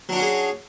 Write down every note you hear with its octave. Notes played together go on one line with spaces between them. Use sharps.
F#3 C#4 D4 F#4 G#4